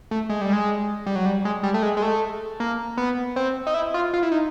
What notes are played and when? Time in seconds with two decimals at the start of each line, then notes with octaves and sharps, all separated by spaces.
0.11 A3
0.30 G#3
0.41 G3
0.53 G#3
1.06 G3
1.16 F#3
1.26 G3
1.45 G#3
1.63 G3
1.74 A3
1.83 G#3
1.97 G#3
2.02 A3
2.60 A#3
2.97 B3
3.36 C4
3.67 D#4
3.74 E4
3.94 F4
4.13 F4
4.23 E4
4.32 D#4